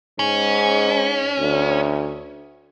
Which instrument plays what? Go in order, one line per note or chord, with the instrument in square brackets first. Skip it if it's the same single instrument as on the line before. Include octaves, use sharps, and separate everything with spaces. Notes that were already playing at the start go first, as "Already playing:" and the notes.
[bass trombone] G#2 [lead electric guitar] C#4
[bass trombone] D2